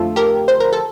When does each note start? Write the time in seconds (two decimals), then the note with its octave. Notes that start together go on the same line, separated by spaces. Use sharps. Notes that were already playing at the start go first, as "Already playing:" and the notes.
Already playing: F2 D3 F3 A3 F4 A4
0.16 G4 A#4
0.48 C5
0.60 A#4
0.73 A4